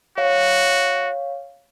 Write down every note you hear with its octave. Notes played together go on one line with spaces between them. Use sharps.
F#4 C#5 F5